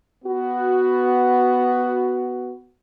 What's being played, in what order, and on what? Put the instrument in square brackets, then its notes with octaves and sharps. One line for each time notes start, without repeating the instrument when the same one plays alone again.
[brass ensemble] B3 F#4